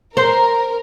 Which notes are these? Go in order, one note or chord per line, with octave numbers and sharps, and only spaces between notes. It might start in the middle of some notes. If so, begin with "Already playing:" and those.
A#4 C5